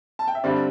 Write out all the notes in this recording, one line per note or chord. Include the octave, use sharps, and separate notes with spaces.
A5
G5
E5
G2 D3 G3 C4 D5